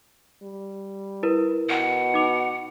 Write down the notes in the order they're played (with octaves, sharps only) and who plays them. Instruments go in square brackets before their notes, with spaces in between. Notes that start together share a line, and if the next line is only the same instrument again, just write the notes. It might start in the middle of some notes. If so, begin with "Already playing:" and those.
[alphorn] G3
[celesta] E4 A#4 B4
[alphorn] B2 [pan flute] F#5
[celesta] D#4 D6 F7